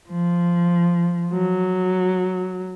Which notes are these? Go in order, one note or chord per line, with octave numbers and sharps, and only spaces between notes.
F3
F#3